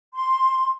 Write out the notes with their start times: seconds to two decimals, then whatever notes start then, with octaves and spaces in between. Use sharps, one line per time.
0.14 C6